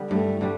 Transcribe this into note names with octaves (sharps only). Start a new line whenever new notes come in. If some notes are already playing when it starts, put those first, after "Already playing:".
Already playing: D3 G3 B3
G2 A3
D3 G3